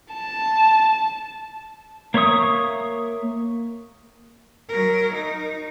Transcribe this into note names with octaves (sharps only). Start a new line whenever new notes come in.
A5
A#3 C#5 E5 C#6 D#6
F#3 A#4
D#4